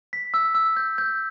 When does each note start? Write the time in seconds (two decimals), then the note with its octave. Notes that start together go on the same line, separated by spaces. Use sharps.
0.13 B6
0.34 E6
0.55 E6
0.77 G6
0.98 G6